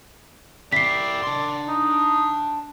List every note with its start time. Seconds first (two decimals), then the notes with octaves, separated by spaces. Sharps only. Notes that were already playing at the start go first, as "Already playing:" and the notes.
0.72 E4 G4 D5 B6 C7
1.23 D4 C6
1.68 D#4